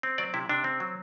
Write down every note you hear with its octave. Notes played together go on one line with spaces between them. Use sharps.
C4
F#3 D5
C3 E4
C3 D4
C4
F#3